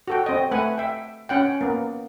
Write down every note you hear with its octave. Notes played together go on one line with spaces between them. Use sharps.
F#4 A4 G5
C4 D#5
A3 B4 F#5 G#5
E5 G5
C#4 F#5 G5
A#3 B3